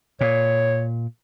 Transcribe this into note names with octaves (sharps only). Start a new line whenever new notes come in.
A#2 C#5